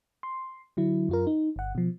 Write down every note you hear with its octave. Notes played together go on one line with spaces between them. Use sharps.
C6
D3 F#3 E4
F#2 F4 A#4
D#4
G1 F#5
B2 F3